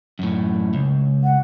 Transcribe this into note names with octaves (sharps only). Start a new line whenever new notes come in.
F#2 A2
C#2
F#5